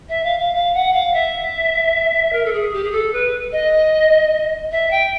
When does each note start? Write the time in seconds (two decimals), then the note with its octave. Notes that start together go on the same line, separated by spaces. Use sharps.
0.09 E5
0.23 F5
0.39 F5
0.54 F5
0.74 F#5
0.93 F5
1.13 E5
2.32 A#4
2.45 A4
2.52 G#4
2.73 G4
2.84 G#4
2.92 A4
3.13 B4
3.52 D#5
4.71 E5
4.91 G5